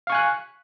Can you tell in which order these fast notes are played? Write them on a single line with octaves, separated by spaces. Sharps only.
F5 C#6 G#5 F#6